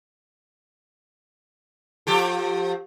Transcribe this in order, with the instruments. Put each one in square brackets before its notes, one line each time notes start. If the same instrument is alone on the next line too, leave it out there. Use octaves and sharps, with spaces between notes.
[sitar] F3 G4 A4